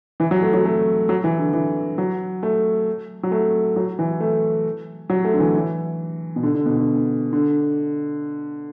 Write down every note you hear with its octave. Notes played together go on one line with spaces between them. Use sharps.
E3
F#3
A3
F#3
A3
F#3
E3
D3
E3
F#3
A3
F#3
A3
F#3
E3
A3
F#3
A3
D3
E3
E3
B2
D3
D3
B2
D3
D3